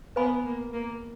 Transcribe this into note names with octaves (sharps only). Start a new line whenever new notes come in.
B3 B4 F5 G#5 B5
A#3
A#3